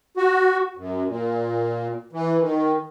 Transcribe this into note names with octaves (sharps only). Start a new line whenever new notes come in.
F#4
F#2
A#2
E3
D#3